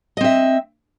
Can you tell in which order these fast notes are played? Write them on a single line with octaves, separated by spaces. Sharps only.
D#5 C4 E5